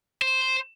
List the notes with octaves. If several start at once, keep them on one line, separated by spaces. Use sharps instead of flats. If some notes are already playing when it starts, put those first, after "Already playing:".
C5